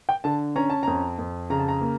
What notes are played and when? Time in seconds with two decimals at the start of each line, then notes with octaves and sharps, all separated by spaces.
0.09 G5
0.24 D3 A5
0.56 C#4 A#5
0.70 A5
0.83 F2 A#5
1.19 F2
1.50 C#3 A#5
1.59 A5
1.69 A#5
1.81 A#3